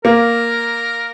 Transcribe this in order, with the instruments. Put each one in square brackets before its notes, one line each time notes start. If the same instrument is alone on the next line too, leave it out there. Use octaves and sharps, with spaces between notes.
[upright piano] A#3 [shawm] A#4